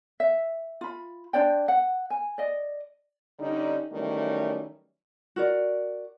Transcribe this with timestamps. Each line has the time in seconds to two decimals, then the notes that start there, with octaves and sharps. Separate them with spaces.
0.20 E5
0.81 F4 B5
1.33 D4 C5 D5 G5
1.68 F#5
2.10 G#5
2.38 D5 D#5
3.39 D3 G3 C#4 D#4
3.91 D#3 E3 F#3 G3 A3 C#4
5.36 F#4 A#4 D5